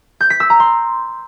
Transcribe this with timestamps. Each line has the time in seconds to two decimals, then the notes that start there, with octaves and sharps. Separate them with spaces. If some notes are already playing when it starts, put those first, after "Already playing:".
0.21 G6
0.30 B6
0.40 E6
0.50 A#5
0.60 C6